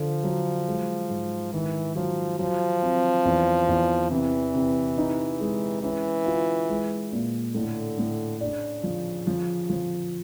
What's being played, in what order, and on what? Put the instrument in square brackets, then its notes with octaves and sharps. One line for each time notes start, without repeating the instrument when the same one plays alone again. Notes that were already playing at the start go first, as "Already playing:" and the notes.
Already playing: [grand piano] D3 [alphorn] F3
[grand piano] F#3
G#3
G#2
[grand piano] D#3 [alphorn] E3
[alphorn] F3 [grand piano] F#3
[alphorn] F3 [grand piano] F#3
[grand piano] C4
E2
E2
[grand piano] C3 [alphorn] E3
[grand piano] C3
D#4
G#3
[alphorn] E3 [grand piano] C#4
[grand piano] F4
G#3
A#2
[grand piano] A2 [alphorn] D3
[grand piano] A2
[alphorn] C#3 [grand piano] D4
[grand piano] F3
F3
F3